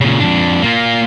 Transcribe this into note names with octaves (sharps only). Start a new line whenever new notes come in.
A#2 C#3
F2 D4
A#3 F4